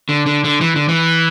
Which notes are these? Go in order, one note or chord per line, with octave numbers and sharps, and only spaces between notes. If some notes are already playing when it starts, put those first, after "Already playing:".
D3
D3
D3
E3
D3
E3